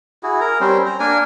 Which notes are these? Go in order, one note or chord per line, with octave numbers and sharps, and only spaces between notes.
E4 F#4 G#4
A#4 A#5
G3 C4 C#4 C5
C5 A#5
A#3 D4 A#4 G#5